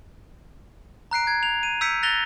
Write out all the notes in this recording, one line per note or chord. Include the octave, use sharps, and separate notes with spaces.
A#5 F#6 C7 D7
G#6
F7
D#7
E6 G6 B6 C#7 D7
F#6 A6 A#6 F7 G7